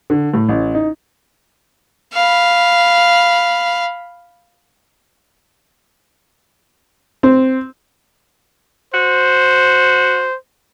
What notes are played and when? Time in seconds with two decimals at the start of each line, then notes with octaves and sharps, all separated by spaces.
0.10 D3
0.34 A2
0.49 A1
0.75 D#4
2.13 F5 B5
7.23 C4
8.94 F#4 C5